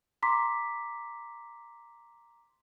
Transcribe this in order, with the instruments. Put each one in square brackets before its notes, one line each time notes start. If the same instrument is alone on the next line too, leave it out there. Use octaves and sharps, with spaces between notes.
[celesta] A#5 C6 D6 B6